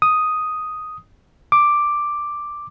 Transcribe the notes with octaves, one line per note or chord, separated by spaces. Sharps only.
D#6
D6